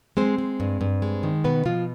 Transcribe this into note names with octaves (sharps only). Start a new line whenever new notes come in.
G#3 C4 C5
G#3
G2
G2
G#3
D#3
B2 B3 B4
B2 F3 F4